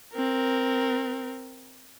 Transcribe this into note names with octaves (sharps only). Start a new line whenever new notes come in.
C4 A#4